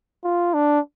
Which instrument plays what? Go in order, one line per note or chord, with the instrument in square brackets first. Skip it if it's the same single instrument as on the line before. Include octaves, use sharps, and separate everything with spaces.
[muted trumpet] F4
D4